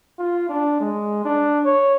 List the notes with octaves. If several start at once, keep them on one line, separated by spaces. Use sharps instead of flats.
F4
D4
G#3
D4
C#5